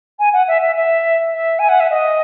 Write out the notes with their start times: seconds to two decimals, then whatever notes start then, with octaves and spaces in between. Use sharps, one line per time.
0.19 G#5
0.33 F#5
0.48 E5
0.62 E5
0.77 E5
1.34 E5
1.59 G#5
1.69 F#5
1.80 E5
1.90 D#5